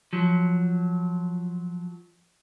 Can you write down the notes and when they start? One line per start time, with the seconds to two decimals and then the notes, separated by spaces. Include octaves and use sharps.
0.13 F3 F#3